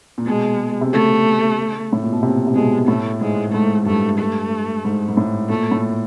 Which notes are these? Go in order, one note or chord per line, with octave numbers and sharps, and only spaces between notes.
A#2
B2 G#3
C3
C#3 A3
A2
A#2
B2
C3
C3
B2 G#3
A2 A3
G#2 G#3
G#2 A3
G2 A3
A3
G#2
G#2
A2
A#2 A3
A2